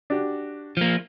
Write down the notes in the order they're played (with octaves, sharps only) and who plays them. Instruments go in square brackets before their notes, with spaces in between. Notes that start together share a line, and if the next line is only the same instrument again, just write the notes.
[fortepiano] D4 F#4 G4
[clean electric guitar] F3 A#3